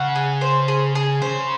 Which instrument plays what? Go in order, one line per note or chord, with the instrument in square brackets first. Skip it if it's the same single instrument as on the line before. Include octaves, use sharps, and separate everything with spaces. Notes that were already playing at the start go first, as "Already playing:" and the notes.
Already playing: [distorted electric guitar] C#3 [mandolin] F#5
[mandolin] G#4
C5
G#4
G#4
[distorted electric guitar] C#3 [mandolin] C5